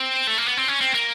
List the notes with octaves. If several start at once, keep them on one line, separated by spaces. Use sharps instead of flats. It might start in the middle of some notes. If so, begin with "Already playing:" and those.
Already playing: C4
A3
A#3
B3
C4
C#4
C4
A#3